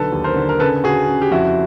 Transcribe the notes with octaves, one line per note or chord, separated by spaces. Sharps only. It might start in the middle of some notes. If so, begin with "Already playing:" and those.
Already playing: B1 D3 A4 B4
D#2
A#4 C5
D3
A#4
C#3 A4 B4
C#3 F#4 G#4
C#3
G4
F2 E4 F#4